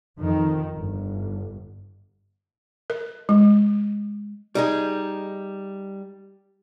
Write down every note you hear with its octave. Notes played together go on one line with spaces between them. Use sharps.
F2 D#3
G1
A#4
G#3
G3 D#4 G#4